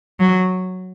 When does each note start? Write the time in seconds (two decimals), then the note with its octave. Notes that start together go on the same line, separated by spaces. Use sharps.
0.20 F#3